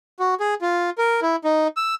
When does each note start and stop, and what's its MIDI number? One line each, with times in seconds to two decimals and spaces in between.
0.20 0.34 66
0.40 0.54 68
0.61 0.90 65
0.98 1.20 70
1.22 1.36 64
1.44 1.68 63
1.77 1.95 88